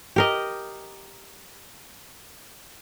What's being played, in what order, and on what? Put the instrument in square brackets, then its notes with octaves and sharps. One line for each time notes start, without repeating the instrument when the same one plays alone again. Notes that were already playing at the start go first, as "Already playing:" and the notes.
[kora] G4 A#4 D#5